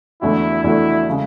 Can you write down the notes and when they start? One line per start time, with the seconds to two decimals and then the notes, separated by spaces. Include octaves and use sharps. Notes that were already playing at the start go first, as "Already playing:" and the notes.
0.22 E2 D3 A3 D4 E4 F#4
0.64 E2 D3 A3 D4 E4 F#4
1.09 C#3 G#3